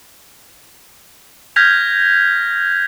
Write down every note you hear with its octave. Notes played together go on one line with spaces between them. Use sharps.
F6 G6 G#6 A#6 B6 F7